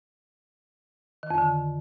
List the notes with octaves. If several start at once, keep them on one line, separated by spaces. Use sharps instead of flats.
D#3
F2
D3